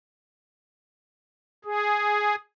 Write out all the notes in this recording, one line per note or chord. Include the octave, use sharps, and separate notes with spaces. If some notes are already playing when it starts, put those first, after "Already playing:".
G#4